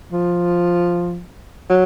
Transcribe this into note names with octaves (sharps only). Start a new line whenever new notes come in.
F3
F#3